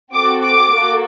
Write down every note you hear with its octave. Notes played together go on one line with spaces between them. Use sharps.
C4 F#4 A4 D6
D6
A#3 F#4 A4